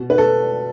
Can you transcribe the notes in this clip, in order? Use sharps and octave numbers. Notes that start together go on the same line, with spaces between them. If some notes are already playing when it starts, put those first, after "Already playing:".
Already playing: B2
B4
A4